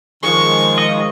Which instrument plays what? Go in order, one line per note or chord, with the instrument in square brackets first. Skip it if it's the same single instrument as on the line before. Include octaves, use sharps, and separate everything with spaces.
[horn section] D#3 F3 [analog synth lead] G#3 [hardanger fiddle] C#6
[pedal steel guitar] D#5